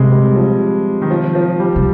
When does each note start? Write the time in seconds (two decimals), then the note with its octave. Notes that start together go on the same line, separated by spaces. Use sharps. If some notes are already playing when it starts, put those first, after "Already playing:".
Already playing: C3 G3 G#3
0.11 G3
0.36 F3
1.02 D#3
1.10 F3
1.35 F3
1.60 G3
1.76 C3